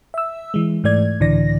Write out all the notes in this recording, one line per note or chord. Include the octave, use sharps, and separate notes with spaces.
E5 E6
E3 G#3
G#2 E3 A3 D5 G#6
C#2 A2 D3 E3 D5 A#6